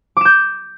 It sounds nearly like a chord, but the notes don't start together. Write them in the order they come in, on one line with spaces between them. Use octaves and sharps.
D6 E7 G6